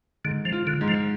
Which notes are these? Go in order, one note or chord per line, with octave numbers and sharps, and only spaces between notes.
G#2 D3
F3
F4
D3
G#2
F3